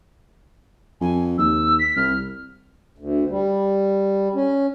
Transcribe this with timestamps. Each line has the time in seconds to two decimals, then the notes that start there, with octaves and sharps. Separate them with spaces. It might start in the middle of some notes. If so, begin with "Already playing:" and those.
1.01 F2 G#5
1.38 D#2 E6
1.79 B6
1.96 C2 F6
2.98 D2
3.30 G3
4.35 C#4